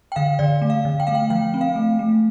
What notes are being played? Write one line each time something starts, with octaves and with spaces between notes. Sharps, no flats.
G5
D3 F5
D3 D5
A3
F5
D3
G5
A3 F5
G5
F3 G5
C4
F5
A3
A3